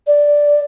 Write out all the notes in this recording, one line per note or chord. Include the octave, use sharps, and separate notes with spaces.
D5